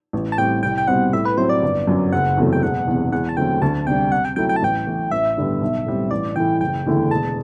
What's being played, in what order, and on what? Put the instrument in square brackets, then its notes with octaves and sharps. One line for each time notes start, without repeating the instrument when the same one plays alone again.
[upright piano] A1
[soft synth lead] A5
[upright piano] A2 G3 C4 [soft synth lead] G5
[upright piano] C2 [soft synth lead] G5
[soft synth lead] G5
[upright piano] B2 G3 C4 [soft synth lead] F#5
[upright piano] A2 [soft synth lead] E5
[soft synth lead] B4
[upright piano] F#3 C4 E4 [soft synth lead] C5
[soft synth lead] D5
[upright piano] G1
F#2 F#3
[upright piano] F#1 [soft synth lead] F#5
[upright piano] E2 C3 F#3 A3
[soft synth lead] G5
[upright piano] E1 [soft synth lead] F#5
[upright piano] E2 C3
[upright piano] E2 [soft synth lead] F#5
[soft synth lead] A5
[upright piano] D3 F#3 A3 C4 [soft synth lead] G5
[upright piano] D2 [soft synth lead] A5
[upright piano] C3 G3 D4 [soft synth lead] G5
[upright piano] C3 [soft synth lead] F#5
[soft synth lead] G5
[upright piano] F#3 A3 E4 [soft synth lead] G5
[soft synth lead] G5
A5
[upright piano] A1 [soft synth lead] G5
[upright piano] A2 E3
[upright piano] A1 [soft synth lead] E5
[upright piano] G2 D3 G3 B3
B1
A2 G3 C4
[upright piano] A1 [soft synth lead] D5
[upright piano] A2 E3 [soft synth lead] G5
[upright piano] F#1 [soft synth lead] G5
[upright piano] E2 D3 A3 E4
[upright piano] E1 [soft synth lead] A5